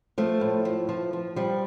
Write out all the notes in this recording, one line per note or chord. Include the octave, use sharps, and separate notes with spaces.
F3 A3
A2
F3
F3
F3
F3 G3